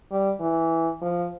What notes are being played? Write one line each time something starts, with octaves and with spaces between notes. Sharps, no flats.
G3
E3
F3